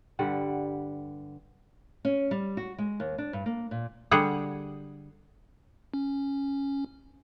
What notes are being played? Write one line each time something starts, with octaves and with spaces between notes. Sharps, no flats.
G2 D3 G3 F#5
C#4
G3
F#4
G#3
D#2
D4
G2
A#3
A#2
D3 G3 G#4 F#5
C#4